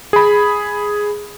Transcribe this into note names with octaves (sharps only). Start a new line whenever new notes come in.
G#4 B5